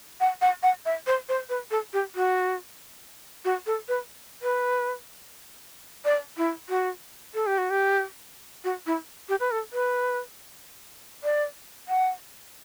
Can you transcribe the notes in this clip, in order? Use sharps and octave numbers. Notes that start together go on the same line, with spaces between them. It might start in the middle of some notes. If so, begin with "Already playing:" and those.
F#5
F#5
F#5
E5
C5
C5
B4
A4
G4
F#4
F#4
A4
B4
B4
D5
E4
F#4
A4
G4
F#4
G4
F#4
E4
G4
B4
A4
B4
D5
F#5